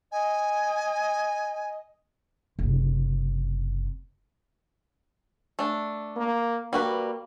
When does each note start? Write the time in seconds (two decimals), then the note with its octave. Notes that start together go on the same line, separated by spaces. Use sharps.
0.12 D#5 G#5
2.59 F#1 C3
5.59 A3 D4
6.17 A#3
6.73 G3 A#3 F#4 B4